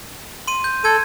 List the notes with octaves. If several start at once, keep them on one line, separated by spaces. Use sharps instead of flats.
C6 D#7
G6
A4 G#6 D#7